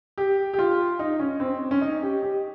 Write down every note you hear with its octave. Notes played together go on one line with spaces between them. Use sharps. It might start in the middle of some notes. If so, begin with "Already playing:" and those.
G4
G4
F4
D#4
C#4
C4
C#4
D#4
G4
G4